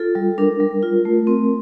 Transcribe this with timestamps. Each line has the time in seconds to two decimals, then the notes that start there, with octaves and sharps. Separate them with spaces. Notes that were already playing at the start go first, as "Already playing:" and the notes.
Already playing: F4 A4
0.15 G3
0.38 D4 A#4
0.60 G3
0.82 F4
1.05 A3
1.27 C4